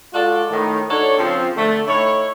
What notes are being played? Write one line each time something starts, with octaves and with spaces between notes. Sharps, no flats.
G#3 F4 F#4 A4 D5
A2 D#3
D4 D#4 F#4 A4 C#5
C#3 F3 C4
D3 A3
A2 D#4 E4 C#5